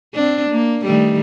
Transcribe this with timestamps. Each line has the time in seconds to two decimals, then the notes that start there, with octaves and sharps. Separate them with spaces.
0.14 C4 D4
0.51 A#3
0.84 D#3 G3 A3